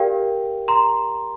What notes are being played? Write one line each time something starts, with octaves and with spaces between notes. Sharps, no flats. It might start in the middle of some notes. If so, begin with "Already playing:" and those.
Already playing: G4 A#4 D5 F5 G5
A#5 C6